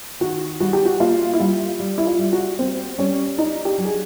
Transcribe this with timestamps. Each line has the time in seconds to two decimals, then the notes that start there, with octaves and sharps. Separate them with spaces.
0.20 D#3 F#4
0.60 G3 F#4
0.73 G4
0.85 F#4
1.00 A#3 F4
1.33 E4
1.40 G3 F4
1.80 G3
1.98 E4
2.06 F4
2.19 G3
2.33 F#4
2.58 G3 C4
2.98 G3 C#4
3.38 D4 D#4
3.65 G4
3.78 F#3
3.85 G#4